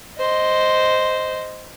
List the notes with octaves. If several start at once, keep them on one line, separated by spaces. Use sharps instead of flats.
C5 D#5